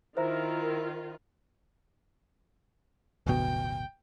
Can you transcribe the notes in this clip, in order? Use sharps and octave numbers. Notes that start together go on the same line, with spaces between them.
D#3 E4 F4 A#4 C5 E5
D1 G1 B2 G5